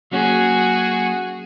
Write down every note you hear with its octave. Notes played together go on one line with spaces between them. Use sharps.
F#3 A#3 C#4 F#4 G#4